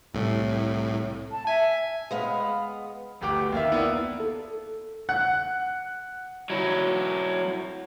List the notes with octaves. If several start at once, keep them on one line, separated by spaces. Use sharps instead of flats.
C2 A2
A5
E5 G#5
G#3 B3 F5
G1 D2 G4 F#5 D6
D#2 A#3 E5
B3 D4 E4 F4 A#4
A4
F#5 F#6
F#3 E4